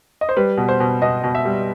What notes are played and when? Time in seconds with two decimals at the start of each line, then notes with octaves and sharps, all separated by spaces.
0.21 D#5
0.29 C5
0.36 G3 B4
0.57 B2
0.69 C5
0.80 B2
1.02 B2 D#5
1.24 B2
1.35 E5
1.45 G3